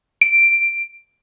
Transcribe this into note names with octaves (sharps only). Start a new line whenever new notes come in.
D7